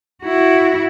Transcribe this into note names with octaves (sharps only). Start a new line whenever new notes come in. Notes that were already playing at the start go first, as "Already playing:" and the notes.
E4 F#4